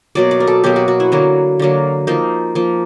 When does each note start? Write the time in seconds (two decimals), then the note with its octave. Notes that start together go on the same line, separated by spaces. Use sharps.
0.15 B2 F#3 A#3 D5
0.31 D5
0.40 A#4
0.47 A4
0.64 B2 F#3 A#3 G4
0.76 F#4
0.88 F#4
1.00 E4
1.12 D3 F#3 A#3
1.59 D3 F#3 A#3
2.07 F3 A#3 D#4
2.55 F3 A#3